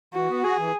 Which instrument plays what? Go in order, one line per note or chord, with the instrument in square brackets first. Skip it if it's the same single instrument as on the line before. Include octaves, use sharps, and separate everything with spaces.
[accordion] E3 [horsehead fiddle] F#4
[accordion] B3
[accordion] F#4 [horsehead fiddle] G#4
[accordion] E3